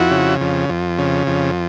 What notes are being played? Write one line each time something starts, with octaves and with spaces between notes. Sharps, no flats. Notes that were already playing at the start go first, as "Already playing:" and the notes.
Already playing: F2 E4 F#4
C#3
F2
F2
C#3
F2